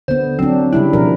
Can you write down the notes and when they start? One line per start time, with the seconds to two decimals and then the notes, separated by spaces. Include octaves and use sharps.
0.08 D3 B3 C5
0.39 F#3 C4 D4
0.73 C#3 G3 D4 E4
0.93 B2 F3 A#4